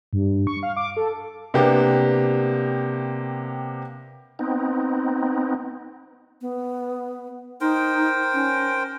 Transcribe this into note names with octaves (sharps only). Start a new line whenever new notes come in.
G2
C#6
F5
D6
A4
C3 A#3 B3 D4 G4
B3 C4 D#4
B3
D#4 A#4 C5 G5
C#4